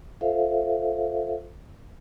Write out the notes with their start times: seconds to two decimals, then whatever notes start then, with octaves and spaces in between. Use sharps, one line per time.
0.21 F4 A4 C5 E5 F5